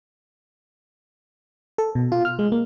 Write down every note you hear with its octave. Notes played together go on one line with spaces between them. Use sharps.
A4
B2
F4
F6
G#3
A#3